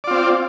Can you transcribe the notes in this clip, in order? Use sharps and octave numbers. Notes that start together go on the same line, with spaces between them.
C4 F4 D5